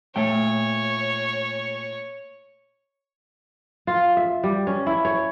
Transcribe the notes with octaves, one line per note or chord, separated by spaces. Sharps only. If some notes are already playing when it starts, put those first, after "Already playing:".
A#2 A3 C#5 G5
F4
E5
G3
C#4
E4
C#5